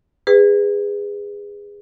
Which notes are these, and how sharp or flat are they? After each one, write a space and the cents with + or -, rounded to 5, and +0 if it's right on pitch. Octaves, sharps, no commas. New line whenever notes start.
G#4 -25 B4 +15